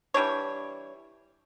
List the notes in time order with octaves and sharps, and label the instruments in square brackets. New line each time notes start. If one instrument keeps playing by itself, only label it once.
[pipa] E3 G3 D4 C#5